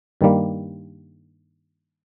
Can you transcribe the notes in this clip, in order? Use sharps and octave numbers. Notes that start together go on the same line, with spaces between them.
G2 D#3 G3 A#3